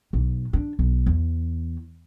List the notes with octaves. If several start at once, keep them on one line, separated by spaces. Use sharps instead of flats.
B1
D4
B1
E2